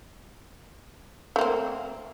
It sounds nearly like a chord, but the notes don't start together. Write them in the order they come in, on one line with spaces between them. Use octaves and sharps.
A3 A#3 C4